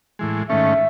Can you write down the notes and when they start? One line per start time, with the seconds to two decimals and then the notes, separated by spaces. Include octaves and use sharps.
0.19 A2 E3 G#3
0.49 G#2 D#3 A3 C#4 E5